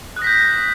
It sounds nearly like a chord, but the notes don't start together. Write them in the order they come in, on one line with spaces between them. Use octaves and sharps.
F#6 D#6 A#6 B6 G6